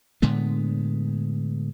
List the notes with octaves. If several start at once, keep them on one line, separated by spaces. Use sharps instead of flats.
A2 D3 G#3 B3